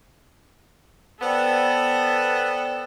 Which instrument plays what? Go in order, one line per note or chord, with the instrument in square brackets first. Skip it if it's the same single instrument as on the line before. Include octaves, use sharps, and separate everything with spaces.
[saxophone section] B3 F#5 [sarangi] A4 [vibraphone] C5 D5 G5